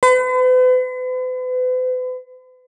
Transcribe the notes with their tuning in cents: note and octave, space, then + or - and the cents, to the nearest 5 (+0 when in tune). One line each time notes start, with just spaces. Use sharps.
B4 +45